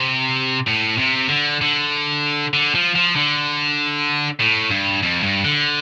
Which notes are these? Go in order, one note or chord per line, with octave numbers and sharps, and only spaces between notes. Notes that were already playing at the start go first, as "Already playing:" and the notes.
Already playing: C3
A2
C3
D3
D3
D3
F3
F3
D3
A2
G2
F2
G2
D3